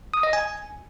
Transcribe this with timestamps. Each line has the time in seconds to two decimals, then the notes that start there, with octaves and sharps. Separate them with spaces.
0.14 D#6
0.23 D#5
0.33 G#5